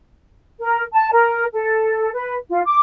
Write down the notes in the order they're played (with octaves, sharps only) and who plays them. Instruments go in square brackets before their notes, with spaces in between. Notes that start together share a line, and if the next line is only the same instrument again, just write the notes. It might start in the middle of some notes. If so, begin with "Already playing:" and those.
[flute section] A#4
A5
A#4
A4
B4
F4
D6